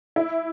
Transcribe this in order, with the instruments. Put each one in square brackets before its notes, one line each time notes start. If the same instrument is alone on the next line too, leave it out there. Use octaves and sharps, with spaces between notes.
[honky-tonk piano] E4